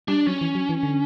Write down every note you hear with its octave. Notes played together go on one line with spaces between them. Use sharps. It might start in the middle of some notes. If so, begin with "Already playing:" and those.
G3 D4
F#3 C#4
E3
F#3
E3
D3